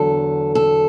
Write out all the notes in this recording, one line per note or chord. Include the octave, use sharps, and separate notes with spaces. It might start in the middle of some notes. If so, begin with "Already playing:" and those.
Already playing: E2 D3 F#3 A4
A4